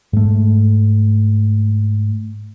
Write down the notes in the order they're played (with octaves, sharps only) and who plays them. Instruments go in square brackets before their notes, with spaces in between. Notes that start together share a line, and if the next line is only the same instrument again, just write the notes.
[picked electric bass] G#2 A3